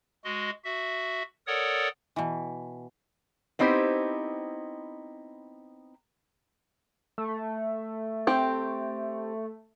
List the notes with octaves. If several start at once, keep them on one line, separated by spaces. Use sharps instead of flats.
G#3 F#4 D#5
F#4 E5
A4 A#4 C#5 D5 F#5 D#6
B2 E3
B3 C4 D#4 E4 G4 C5
A3
C4 G4